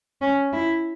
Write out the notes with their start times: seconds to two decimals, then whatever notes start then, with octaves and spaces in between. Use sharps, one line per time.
0.21 C#4
0.53 E4